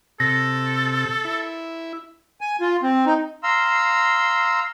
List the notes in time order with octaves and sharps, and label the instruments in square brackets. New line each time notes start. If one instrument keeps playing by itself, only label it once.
[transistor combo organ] C3 [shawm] A4 [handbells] A#6
[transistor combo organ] E4
[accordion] G#5
F4
C4
D#4
[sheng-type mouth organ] F5 A#5 C6 E6